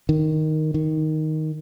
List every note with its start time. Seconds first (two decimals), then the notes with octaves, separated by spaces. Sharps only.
0.09 D#3
0.74 D#3